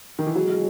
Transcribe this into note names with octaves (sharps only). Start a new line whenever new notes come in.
D#3
E3
B1 A2 F#3 G#3